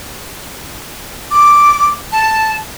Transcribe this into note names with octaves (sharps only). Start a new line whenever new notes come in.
D6
A5